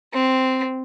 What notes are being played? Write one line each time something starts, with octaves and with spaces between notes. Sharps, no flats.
C4